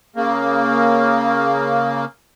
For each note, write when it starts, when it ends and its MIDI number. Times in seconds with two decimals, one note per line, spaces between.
0.16 2.05 49
0.16 2.05 58